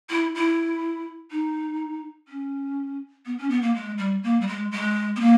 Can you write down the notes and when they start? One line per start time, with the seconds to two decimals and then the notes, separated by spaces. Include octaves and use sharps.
0.10 E4
0.35 E4
1.31 D#4
2.28 C#4
3.26 B3
3.38 C#4
3.50 B3
3.62 A#3
3.75 G#3
3.98 G3
4.23 A#3
4.41 G3
4.48 G#3
4.71 G#3
5.16 B3
5.20 A#3